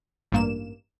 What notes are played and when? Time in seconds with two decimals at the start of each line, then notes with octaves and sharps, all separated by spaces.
0.32 A1 G2 A#3 E7